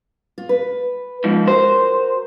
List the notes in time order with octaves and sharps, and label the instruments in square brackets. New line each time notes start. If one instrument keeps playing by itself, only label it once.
[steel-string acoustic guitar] F4
B4
[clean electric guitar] G#2 F3
[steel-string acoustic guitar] F#4 A#4 [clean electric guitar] C5